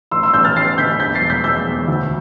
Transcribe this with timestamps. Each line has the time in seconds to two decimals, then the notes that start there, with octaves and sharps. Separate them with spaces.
0.11 A1 C6 E6
0.23 C6 E6
0.34 A1 E6 G6
0.45 F6 A6
0.56 A1 A6 C7
0.78 D3 G6 B6
1.00 E2 G6 B6
1.15 A6 C7
1.22 E1
1.30 G6 B6
1.44 E1 E6 G6
1.66 E2
1.88 D2